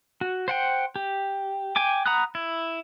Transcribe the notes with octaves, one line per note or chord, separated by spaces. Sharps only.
F#4
C5 F#5 G5
G4
G5 G#5 D6
F#5 A#5 B5 D#6 F#6
E4